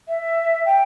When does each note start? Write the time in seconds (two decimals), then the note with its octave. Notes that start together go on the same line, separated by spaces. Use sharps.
0.09 E5
0.66 G5